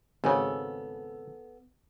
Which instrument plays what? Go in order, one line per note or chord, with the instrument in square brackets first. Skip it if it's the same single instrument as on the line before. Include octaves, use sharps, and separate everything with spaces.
[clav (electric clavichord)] G#1 C#3 [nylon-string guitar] B3 A4 G#5